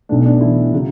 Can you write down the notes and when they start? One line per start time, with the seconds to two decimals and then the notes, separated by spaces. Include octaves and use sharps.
0.09 B1 B2 A3 D4
0.26 D4
0.41 E3 E4
0.73 C#3 F#3